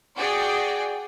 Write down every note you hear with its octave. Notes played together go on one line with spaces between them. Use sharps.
F#4 G#4 D5 G5